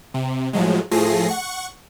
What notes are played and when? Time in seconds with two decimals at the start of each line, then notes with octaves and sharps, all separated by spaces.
0.14 C3
0.53 A2 F3 F#3 G#3
0.91 A2 F3 A3 G#4 A#6 C7
1.28 F#5 C#6